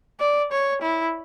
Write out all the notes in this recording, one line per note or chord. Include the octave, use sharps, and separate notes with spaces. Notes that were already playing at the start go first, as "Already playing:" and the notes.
D5
C#5
E4